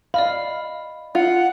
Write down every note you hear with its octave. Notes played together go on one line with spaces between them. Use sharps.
D5 D#5 F5 B5
F4 F#5